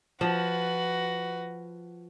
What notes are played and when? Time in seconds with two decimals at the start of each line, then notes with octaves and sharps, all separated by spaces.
0.21 F3 F#4 B4